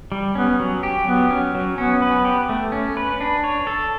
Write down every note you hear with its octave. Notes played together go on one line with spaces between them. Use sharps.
G3
B3 C#4
F#3
G4
F#3 B3
C#4
F#3
B3 C#4
B4
G4
A3
C#4
B4
D4
C#5
A4